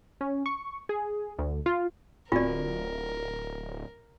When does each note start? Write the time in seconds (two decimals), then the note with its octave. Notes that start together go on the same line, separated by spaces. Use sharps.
0.21 C#4
0.46 C#6
0.89 G#4
1.38 D2
1.66 F4
2.32 D1 C4 F4 F#4 A#4 D5